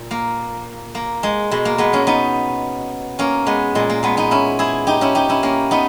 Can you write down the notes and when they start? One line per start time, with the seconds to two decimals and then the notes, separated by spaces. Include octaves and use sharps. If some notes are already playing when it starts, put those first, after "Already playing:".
Already playing: A#2
0.11 A#3
0.95 A#3
1.23 G#3
1.51 B2 G#3
1.65 A#3
1.78 G#3 B3
1.93 A#3 C#4
2.07 B3 D#4
3.19 A#3 C#4
3.46 G#3 B3
3.75 A#2 G#3
3.90 A#3
4.03 G#3 B3
4.17 B3 D#4
4.31 C#4 E4
4.59 E4 G#4
4.87 D#4 G4
5.01 C#4 E4
5.15 D#4 G4
5.29 C#4 E4
5.43 A#3 C#4
5.71 B3 D#4